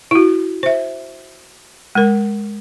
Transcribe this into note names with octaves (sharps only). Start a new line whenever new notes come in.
E4 F#4
C5 E5
G#3 A#4